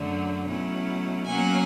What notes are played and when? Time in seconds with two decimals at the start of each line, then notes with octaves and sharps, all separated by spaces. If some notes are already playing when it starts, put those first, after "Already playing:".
Already playing: F#2 D3 F#3 A3
0.47 B2 F#3 A3 C#4 E4
1.26 B2 F#3 A#3 C#4 F#5 G#5